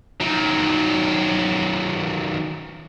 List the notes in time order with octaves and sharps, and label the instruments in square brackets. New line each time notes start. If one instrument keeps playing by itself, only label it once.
[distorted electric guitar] D#3 F#3